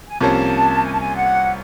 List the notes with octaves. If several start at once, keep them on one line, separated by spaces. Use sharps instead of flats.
G#5
C2 C3 F3 A#3 C#4 A5
G#5
A5
G#5
F#5